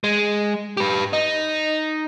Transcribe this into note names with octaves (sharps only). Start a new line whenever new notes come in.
G#3
G4 B4
D#4